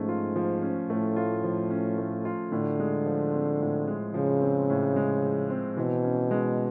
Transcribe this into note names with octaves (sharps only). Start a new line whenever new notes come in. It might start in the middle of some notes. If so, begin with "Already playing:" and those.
Already playing: G#2 F3 A3 C#4
F4
F3
C#4
A2 A3
F4
F3
C#4
A3
F4
A2 D3
G#3
F3
C4
A2
G#3
C#3 F3
C4
A2
G#3
F3
C4
B2 E3
C#4
G#3